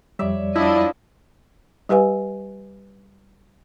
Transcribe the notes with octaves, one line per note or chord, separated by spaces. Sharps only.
F2 G3 C#5 D5 E5
F3 D4 E4 D#5
G3 G4 B4 F5 G#5